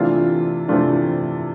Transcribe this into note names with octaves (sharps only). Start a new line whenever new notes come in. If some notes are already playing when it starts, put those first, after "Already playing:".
Already playing: C3 E3 A3 D4 F4
C3 E3 A3 D4 F4